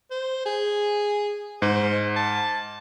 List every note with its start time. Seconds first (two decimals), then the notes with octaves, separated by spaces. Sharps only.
0.11 C5
0.45 G#4
1.62 G#2 C5
2.16 A5